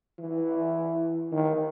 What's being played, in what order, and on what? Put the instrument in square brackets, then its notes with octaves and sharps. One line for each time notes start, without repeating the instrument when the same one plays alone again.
[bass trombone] E3
D#3